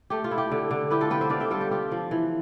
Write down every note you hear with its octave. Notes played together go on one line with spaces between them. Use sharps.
A3 G4
F4
E4
G4
D3
D3
E4 G4 B4
F4 A4
B3 G4 B4
C5 E5
D3 D5 F5
E5 G5
G3 F4 A4
G4
F4 G4
F3
E3